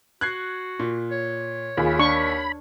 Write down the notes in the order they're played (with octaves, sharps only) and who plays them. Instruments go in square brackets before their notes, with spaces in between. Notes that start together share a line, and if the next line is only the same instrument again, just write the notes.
[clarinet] F#4 [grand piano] F#6 G#6 C7
[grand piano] A#2
[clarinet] C#5
[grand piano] D#2 [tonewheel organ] F4 G#4 B5
[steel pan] D4 C#6 [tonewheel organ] B5